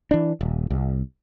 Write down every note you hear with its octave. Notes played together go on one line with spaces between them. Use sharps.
E3 D4
D#1
C2